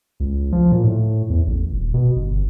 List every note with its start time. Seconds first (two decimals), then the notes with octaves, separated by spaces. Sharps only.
0.20 C#2
0.52 F3
0.72 A#2
0.84 A2
1.30 E2
1.47 A1
1.71 D#1
1.94 B2
2.16 G1